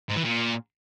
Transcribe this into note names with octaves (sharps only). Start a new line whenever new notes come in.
G#2
E3
A#2